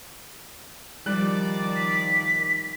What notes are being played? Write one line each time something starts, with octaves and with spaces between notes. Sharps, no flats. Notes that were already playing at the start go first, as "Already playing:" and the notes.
D#3 F3 G3 D5 F#6
B6